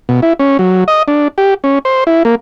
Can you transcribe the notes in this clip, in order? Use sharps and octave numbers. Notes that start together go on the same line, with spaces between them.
B2
E4
C#4
F#3
D#5
D4
G4
C#4
C5
E4
A#3